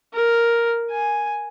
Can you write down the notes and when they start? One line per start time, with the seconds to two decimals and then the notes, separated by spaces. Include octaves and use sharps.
0.13 A#4
0.91 G#5